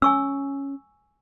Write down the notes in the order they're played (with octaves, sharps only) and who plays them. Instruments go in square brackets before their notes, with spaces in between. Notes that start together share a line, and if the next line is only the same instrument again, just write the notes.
[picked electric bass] C#4 [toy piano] G#5 C#6 E6